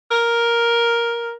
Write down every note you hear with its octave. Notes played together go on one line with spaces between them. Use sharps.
A#4